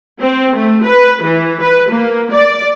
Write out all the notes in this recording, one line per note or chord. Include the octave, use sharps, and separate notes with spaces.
C4
A3
B4
E3
B4
A#3
D5